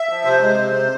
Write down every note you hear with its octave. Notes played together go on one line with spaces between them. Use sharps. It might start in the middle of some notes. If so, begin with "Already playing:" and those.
Already playing: E5
F3
C3 C5
G#3
C3